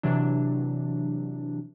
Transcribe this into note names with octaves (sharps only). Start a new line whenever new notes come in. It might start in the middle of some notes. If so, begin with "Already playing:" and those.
C3 E3 F#3 D4